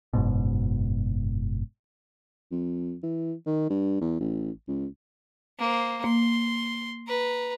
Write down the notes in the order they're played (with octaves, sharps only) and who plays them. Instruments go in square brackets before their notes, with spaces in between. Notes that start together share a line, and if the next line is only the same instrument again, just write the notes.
[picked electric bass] F#1 G#2 B2
[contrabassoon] F2
E3
D#3
G2
E2
A1
C#2
[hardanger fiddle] A#3 C5
[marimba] A#3 [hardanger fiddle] C6
[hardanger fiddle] B4 A#5